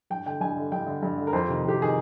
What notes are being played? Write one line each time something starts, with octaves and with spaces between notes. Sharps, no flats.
G2 G5
D3 G5
G2 G#5
D3
G2 G5
D3
G2
D3
A#4
F2 C5
C3 D#3
F2 G4
C3 D#3 G#4